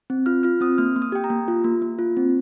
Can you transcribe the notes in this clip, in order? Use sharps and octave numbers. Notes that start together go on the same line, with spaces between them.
C4
F4 F6
F4 F6
C4 D#6
A#3 F6
A#3
D#6
G4 G5
A#5
A#3
F4
A#3
A#3
F4
C4